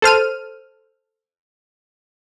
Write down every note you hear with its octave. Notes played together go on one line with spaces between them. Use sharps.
A4 C5 F6 D#7